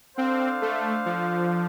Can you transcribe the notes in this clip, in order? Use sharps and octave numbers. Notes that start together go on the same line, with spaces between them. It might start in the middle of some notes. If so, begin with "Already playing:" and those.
C4 D4 A4 C5 F5
A3
F3